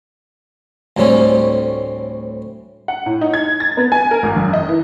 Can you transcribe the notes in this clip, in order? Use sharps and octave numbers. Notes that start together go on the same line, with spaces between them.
D2 A2 G3 C4 C#4
F#5
A2
D#4
G#6
A6
B3
G#5
A#4
G#1
F#1
D#5
E3